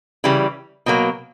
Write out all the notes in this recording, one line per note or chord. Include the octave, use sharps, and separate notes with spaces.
C#3 E3 G3
B2 F#3 A#3